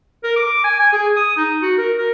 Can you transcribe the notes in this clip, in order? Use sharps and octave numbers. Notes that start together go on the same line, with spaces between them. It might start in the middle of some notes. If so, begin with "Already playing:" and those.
A#4
D6
G#5
G#5
G#4
D#6
D#4
F#4
A#4
A#4